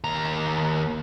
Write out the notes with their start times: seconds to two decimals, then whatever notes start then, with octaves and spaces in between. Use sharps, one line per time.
0.04 D#2 A#5